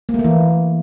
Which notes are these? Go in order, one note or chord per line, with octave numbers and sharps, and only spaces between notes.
A#3
A3
A#3
E3